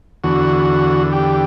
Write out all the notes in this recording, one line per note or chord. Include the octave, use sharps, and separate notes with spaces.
E2 D3 F#4
G4